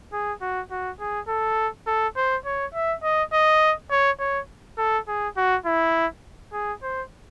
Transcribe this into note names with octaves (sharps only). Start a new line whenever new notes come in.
G#4
F#4
F#4
G#4
A4
A4
C5
C#5
E5
D#5
D#5
C#5
C#5
A4
G#4
F#4
E4
G#4
C5